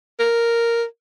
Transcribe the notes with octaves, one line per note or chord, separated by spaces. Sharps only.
A#4